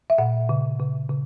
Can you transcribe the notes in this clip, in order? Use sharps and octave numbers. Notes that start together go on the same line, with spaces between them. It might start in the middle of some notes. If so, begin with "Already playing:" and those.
E5
A#2 F#5
C#3
C#3
C#3